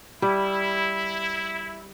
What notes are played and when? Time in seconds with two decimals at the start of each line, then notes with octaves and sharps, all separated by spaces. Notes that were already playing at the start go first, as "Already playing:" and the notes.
0.22 G3 E4